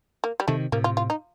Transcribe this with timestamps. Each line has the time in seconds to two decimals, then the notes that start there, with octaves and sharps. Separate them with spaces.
0.24 A#3
0.40 G3
0.48 C3 D#3 A3
0.72 A2 C3 A#3
0.84 F4
0.97 F4
1.10 D#4